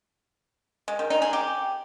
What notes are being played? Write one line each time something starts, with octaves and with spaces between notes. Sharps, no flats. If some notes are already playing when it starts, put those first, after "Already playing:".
G#3
D#3
D#4
G#4
G4